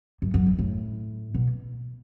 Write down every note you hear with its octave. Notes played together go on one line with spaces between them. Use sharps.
F#2
F#2
G2
A2
B2